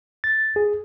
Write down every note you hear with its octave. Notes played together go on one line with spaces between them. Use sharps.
A6
G#4